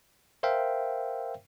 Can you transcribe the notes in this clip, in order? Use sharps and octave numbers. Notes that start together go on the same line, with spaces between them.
A#4 C5 E5 F5 G5